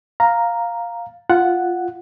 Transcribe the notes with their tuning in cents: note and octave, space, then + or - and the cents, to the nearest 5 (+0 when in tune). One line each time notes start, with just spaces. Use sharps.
F5 +0 A#5 +0
F4 +0 F#5 +0